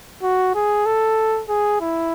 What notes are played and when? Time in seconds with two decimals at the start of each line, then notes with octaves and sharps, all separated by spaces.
0.23 F#4
0.55 G#4
0.86 A4
1.49 G#4
1.81 E4